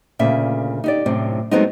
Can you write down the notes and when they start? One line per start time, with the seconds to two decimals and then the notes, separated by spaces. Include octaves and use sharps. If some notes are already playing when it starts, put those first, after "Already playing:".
0.19 D2 A#2 C#3 E5
0.84 D#4 G4 D5
1.06 F#2 A2 C3 C4
1.51 F#3 G#3 A3 B3 C4 D#4